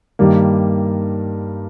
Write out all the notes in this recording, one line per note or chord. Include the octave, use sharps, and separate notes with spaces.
G2 D#3 G3 A#3